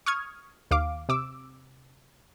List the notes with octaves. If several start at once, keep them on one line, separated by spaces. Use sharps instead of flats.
C#6 D#6 F6 G#6
D#2 F5 D6
C3 D6 E6